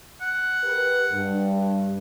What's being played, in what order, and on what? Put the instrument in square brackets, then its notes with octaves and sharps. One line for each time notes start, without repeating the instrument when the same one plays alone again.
[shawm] F#5
[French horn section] G4 A#4 B4
G2